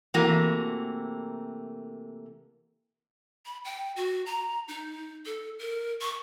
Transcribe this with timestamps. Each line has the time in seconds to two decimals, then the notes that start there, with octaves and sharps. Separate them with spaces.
0.14 C3 E3 A3 A#3 F#4
3.45 B5
3.64 G5
3.96 F#4
4.26 A#5
4.68 D#4
5.25 A4
5.59 A#4
6.01 C#6